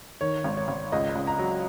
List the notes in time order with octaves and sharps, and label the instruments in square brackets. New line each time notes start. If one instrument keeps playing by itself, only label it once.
[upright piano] D#3 C#5
G#1
C#5
G#1
C#2 D#5
C#2
A#5
F#3